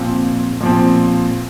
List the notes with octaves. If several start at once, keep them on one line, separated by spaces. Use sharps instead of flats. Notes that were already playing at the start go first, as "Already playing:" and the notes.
Already playing: A#2 F3 C4
A#2 F3 C4